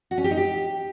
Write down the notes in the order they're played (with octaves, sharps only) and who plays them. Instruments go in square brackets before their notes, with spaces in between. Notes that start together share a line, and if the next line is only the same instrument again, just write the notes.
[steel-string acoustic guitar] F#4
C#4
G4
D#4
G4